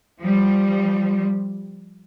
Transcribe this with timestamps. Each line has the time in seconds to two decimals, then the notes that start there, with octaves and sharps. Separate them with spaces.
0.22 F3 G3